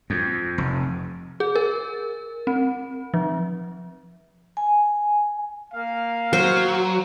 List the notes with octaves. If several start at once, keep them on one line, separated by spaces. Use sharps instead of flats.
F2
F1
G#4
A#4
C4
F3
G#5
A#3 F5
F#3 C5